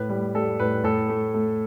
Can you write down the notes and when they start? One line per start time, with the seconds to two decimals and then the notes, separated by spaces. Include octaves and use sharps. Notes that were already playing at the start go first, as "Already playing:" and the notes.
Already playing: A2 B4
0.09 G3
0.35 G3 A4
0.59 A2 B4
0.84 A2 A4
1.09 A3
1.34 A3